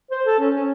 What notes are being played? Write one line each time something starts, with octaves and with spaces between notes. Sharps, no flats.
C5
A4
C#4
C#4